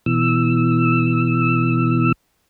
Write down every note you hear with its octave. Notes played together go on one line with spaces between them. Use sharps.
B2 E3 E6